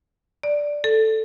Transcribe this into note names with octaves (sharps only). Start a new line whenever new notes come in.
D5
A4